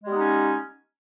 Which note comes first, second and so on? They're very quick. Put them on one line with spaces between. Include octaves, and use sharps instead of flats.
G#3 G3 B3 D#4 C#4